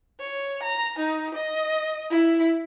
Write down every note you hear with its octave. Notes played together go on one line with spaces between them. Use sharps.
C#5
A#5
D#4
D#5
E4